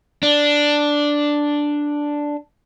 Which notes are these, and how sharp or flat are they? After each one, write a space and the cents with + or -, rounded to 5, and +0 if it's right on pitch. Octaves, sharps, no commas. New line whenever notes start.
D4 +0